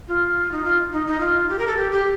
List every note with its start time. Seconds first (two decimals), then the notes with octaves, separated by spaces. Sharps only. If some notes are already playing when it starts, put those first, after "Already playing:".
0.08 F4
0.51 D#4
0.64 F4
0.93 D#4
1.07 D#4
1.20 F4
1.49 G4
1.59 A#4
1.67 A4
1.77 G4
1.92 G4